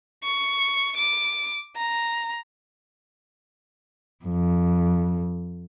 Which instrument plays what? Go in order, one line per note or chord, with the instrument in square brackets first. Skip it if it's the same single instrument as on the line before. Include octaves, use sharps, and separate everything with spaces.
[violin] C#6
D6
A#5
[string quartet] F2